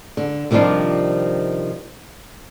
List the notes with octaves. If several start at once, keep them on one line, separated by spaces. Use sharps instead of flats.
D3
C3 D#3 F3 G3 D4 F4